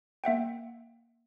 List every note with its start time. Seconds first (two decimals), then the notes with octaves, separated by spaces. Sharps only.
0.24 A#3 E5 F#5 G5